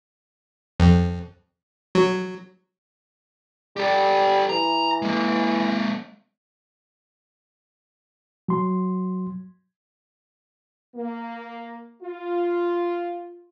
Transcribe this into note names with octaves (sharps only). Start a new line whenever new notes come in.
F2
F#3
G3 G4 A4
E3 A#5
G#3 A#3
F#3 C6
A#3
F4